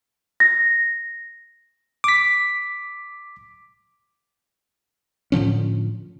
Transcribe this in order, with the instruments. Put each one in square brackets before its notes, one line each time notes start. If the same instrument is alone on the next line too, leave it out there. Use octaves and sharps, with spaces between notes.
[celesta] A#6
[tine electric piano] D6 B6
[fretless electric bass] A2 D3 F3 C#4